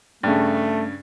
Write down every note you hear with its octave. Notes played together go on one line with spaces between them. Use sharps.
G2 C#3 A3